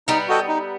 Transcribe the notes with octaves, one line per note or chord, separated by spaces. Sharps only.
G3 B3 D#4
F#4 A4 D#5 G5
D#4